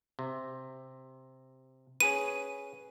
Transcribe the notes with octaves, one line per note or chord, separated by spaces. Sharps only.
C3
C#4 G#4 B4 D#7